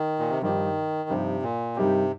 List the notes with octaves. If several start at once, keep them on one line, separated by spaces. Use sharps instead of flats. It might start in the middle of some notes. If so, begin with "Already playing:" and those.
Already playing: D#3
A#2
C3
G2 D#3 F3 D#4 G4
G2 C3 F3 D#4 G4
A#2
G2 C3 G3 D#4 G4 A#4